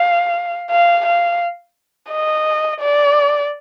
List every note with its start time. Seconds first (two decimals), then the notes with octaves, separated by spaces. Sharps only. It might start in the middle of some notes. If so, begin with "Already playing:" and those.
Already playing: F5
0.71 F5
1.06 F5
2.11 D#5
2.80 D5